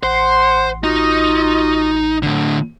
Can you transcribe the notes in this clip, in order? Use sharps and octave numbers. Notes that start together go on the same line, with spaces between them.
A1 C5 F#5 C6
D#4 F4 F#4 D#5
A2 D3